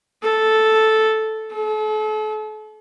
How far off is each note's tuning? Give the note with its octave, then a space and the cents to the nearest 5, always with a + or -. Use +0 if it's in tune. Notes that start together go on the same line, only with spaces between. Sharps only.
A4 -5
A4 -40